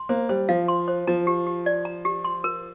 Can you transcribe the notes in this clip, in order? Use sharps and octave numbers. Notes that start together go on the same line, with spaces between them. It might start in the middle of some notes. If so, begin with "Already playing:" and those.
Already playing: C6
A#3 C5
G3 C5
F3 F5
C6
C5
F3 A#5
G4
G4
D5
A#5
G4
C6
A#4